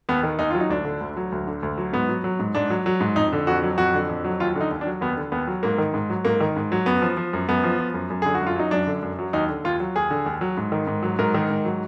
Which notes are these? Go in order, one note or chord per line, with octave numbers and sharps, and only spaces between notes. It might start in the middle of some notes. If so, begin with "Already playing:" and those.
D#2 B3
D#3
D#2 D#4
F#3 F4
D#4
D2 D4
D3
D2
F#3
D2
D3
D2
F#3
G#2 B3
F#3
F#3
G#2
G#2 D4
F#3
F#3
G#2
F2 D#4
D3
F2 F#4
F#3
F2 F#4
D3
F2
F#3
D#2 F4
D3
D#4
D#2
D4
F#3
D#2 B3
D3
D#2 B3
F#3
G#2 A#3
D#3
G#2
F#3
G#2 A#3
D#3
G#2
F#3
F#2 B3
F3
F3
F#2
F#2 B3
F3
F3
F#2
F#2
D3 G#4
F#4
F#2
F4
F#3 D#4
F#2 D4
D3
F#2
F#3
D#2 D#4
D3
D#2 F4
F#3
D#2 G#4
D3
D#2
F#3
G#2
D#3
G#2
F#3
G#2 A#4
D#3
G#2
F#3